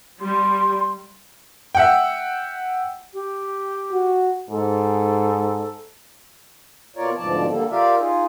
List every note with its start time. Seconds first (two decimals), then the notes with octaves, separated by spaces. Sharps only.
0.20 G3 C6
1.75 E5 F#5 G5
3.13 G4
3.92 F#4
4.50 G#2 A4
6.96 B2 F4 A#4 C#5 D5
7.18 D2 G#2 B2 F3 D5 A5
7.49 D3 G3 A#3 A4
7.71 F4 G4 A#4 D5 E5 F5
7.99 D#4 F4 G#4